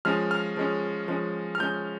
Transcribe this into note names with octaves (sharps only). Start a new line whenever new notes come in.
F3 G#3 C#4 F6
F6
F3 G#3 C#4
F3 G#3 C#4
F6
F3 G#3 C#4 G6